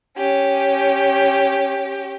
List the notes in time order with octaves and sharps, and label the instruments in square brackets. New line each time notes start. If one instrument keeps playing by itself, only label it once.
[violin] C#4 G4